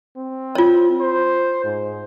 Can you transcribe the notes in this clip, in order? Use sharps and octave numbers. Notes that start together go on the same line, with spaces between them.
C4
F4 C#5
C5
G#2